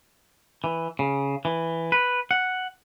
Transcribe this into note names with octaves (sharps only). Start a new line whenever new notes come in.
E3
C#3
E3
B4
F#5